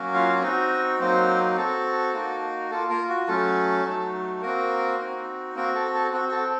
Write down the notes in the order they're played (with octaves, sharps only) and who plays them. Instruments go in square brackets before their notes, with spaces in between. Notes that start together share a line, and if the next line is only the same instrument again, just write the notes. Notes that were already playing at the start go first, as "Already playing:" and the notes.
Already playing: [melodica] F#3 A#3 C#4 F#4
F4 F5
C4 D#4 F#4 D#5
F#3 A#3 C4 D#4 C5
C4 F#4 A4
A#3 D#4 F#4
A#3 F4 A4
A#3 A#4
F#4
F#3 A3 C#4 A4
F#3 A3 D#4
A#3 C4 F#4 A#4
C4 D#4 F#4
A#3 C4 F#4 A#4
A4
A4
C4 F#4
F#4
A4